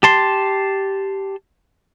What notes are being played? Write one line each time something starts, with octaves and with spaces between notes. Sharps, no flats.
G4 A5 C6